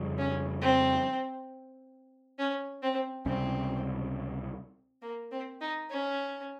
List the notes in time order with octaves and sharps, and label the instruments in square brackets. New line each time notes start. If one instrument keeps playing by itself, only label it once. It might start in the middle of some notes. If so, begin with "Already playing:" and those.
Already playing: [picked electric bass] F2 C#3 G3
[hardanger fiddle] C#4
C4
C#4
C4
[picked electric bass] C#2 C3 G3 C#4 [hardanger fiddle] C4
[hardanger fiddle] A#3
C4
D#4
C#4